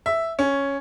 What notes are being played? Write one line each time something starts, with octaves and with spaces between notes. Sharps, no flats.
E5
C#4